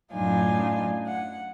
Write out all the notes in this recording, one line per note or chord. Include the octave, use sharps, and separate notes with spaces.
F#2 A2 D4 D#4 F4 G#5
F#5